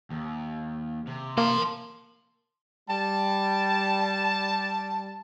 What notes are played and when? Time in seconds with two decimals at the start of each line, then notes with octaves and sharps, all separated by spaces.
0.10 D#2
1.07 C3
1.38 A#3 A5 C6
2.90 G3 A5